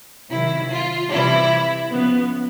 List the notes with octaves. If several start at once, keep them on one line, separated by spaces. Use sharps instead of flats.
C3 D#3 F#3 E4
F4
C3 E3 G3 E4
C#3 F3 B3